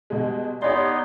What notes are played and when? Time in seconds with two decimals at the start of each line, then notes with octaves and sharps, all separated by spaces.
0.10 B2 G3 G#3
0.62 B3 D#4 G4 C#5 D5 C6